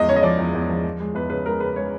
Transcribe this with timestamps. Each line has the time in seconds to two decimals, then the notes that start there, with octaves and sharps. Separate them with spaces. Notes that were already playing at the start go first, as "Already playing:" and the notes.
Already playing: E2 F3 G#3 D#5
0.09 C#3 C#5
0.16 D#5
0.23 F3 D5
0.39 E2
0.55 E2
0.69 F3
0.84 F3
1.00 G#3
1.15 E2 B4
1.30 C#3 B4
1.46 G#3 A#4
1.60 C#3 B4
1.76 G#3 C#5